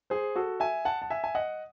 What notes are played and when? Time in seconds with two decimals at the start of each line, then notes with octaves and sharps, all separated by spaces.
0.10 G#4 C5
0.35 F#4 A4
0.60 E5 G#5
0.85 F#5 A5
1.02 A5
1.10 E5 G#5
1.24 G#5
1.35 D#5 F#5